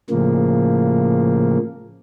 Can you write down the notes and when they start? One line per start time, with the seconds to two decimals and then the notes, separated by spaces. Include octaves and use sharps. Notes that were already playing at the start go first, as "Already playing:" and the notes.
0.10 A2 C#3 F3 A#3